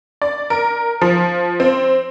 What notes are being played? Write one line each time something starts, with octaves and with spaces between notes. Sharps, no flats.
D5
A#4
F3
C4